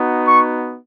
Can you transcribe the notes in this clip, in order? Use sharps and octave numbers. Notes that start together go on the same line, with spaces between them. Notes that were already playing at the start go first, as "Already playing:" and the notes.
Already playing: B3 D#4 F#4
C#6